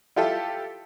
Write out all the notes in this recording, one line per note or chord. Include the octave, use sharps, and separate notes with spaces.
E4 F4 G4 A4 E5